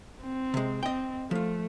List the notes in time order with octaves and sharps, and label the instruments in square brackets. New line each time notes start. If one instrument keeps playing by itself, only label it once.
[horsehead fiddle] C4
[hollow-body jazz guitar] C3 G#3
[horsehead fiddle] C4 [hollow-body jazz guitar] D#5 G5
[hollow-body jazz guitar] F3 F4 [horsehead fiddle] A3